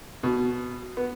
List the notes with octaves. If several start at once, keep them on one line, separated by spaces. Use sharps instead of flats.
B2
B3